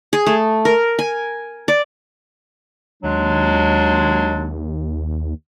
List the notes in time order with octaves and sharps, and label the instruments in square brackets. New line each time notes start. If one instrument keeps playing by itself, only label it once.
[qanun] G#4
A3
A#4
G#5
D5
[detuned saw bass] D#2 [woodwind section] F#3 G#3 D4